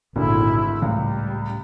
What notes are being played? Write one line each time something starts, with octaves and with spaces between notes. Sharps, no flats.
G#1 D2 A#2 E4
C#2 A2 G3